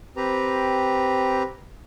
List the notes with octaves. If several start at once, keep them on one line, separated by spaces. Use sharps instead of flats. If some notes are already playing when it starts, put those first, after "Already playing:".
C4 G4 B4 A#5